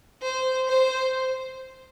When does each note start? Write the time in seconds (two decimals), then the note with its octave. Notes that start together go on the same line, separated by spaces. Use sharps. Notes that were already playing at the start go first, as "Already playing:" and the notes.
0.22 C5
0.68 C5